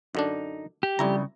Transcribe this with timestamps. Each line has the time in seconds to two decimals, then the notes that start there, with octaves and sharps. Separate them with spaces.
0.15 F#2 D3 D4 D#4
0.83 G4
0.99 F2 C#3 G3 E4 A#5